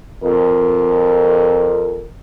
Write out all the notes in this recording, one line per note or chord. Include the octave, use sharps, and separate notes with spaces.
F2 A#4